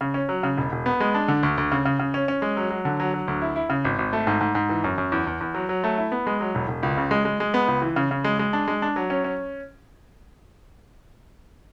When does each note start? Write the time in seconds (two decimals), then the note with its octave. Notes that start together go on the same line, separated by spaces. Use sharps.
0.01 C#3
0.14 C#4
0.29 F#3
0.43 C#3
0.58 E1
0.72 E1
0.86 B3
1.00 G#3
1.14 D4
1.28 D3
1.43 D2
1.58 D2
1.72 C#3
1.85 C#3
1.99 C#3
2.14 C#4
2.28 C#4
2.42 G#3
2.57 F#3
2.70 F#3
2.85 D3
3.00 F#3
3.14 F#3
3.28 D2
3.42 E4
3.56 E4
3.70 C#3
3.85 G#1
3.99 G#1
4.13 A3
4.27 G#2
4.41 G#2
4.55 G#2
4.69 E3
4.84 F#2
4.98 F#2
5.12 E2
5.27 E2
5.41 E2
5.55 F#3
5.69 F#3
5.84 A3
5.98 E4
6.12 B3
6.27 G#3
6.41 F#3
6.55 E1
6.68 E1
6.83 C#2
6.97 C#3
7.11 G#3
7.25 G#3
7.40 G#3
7.54 B3
7.68 C#2
7.82 E3
7.96 C#3
8.11 C#3
8.24 G#3
8.39 G#3
8.53 D4
8.68 G#3
8.82 D4
8.96 F#3
9.10 C#4
9.24 C#4